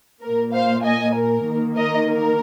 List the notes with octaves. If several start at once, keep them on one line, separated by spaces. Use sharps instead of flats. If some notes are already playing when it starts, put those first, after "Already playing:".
A#3 A#4
A#2
C5 F5
D#5 G#5
A#4
D#3 A#3
A#4 D#5
A#4